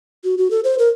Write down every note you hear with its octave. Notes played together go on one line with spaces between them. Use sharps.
F#4
F#4
A4
C5
A#4